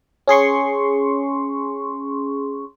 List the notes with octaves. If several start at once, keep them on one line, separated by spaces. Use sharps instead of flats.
C#4 G#4 C6 C#6